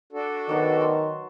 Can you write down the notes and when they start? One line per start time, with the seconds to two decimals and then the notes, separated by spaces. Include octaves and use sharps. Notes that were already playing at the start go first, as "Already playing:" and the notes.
0.13 D4 F#4 A4
0.49 D#3 F#3 B3 F#5
0.81 A5 B5 C6